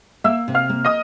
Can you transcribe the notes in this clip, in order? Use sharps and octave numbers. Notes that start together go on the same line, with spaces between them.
A#3 E5 E6
C3
F5 F6
A#3
D#5 D#6